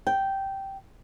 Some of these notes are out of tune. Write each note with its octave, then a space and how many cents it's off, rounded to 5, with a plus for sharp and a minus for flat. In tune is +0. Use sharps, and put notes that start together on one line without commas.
G5 -10